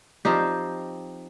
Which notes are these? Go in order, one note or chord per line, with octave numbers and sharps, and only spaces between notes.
F3 C4 D#4 G4